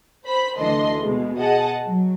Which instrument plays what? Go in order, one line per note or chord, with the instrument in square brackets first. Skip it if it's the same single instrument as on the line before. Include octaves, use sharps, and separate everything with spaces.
[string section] C5 B5 B6
D2 E3 D4 A4 D#5 C6
B2 G#3
G#4 D#5 F#5 A5
F#3